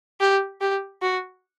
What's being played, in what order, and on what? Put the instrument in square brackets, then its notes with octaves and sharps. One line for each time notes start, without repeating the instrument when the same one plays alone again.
[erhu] G4
G4
F#4